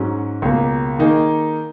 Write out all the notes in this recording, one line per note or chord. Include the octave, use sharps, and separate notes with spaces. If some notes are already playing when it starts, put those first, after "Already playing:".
Already playing: G#2 F#3 C#4
C#2 B2 A#3
D#3 A#3 D#4 G#4